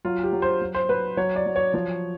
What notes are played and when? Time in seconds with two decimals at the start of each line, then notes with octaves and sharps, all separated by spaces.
0.05 F#3 F4
0.23 G4
0.33 F#3
0.42 C5
0.61 F#3
0.75 C5
0.89 F#3 B4
1.17 F#3 C#5
1.36 D5
1.46 F#3
1.56 C#5
1.74 F3 C#5